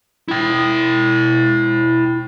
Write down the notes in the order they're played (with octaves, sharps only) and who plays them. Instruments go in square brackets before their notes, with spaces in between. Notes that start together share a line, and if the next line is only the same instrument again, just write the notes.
[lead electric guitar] E4 G5